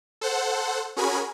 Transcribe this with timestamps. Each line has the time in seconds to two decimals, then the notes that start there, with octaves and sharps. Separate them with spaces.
0.21 A4 C5 F#5
0.96 C#4 F#4 G#4 A#4 G#5 B5